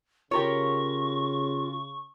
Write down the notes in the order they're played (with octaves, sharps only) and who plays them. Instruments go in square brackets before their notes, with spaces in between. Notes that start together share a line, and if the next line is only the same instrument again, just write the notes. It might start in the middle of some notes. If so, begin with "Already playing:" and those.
[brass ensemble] C#3 [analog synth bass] F4 [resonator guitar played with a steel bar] G4 A#4 C#5 [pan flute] C#6